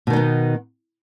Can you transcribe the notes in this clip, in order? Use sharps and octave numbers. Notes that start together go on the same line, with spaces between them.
B2 D#3 B3 D#4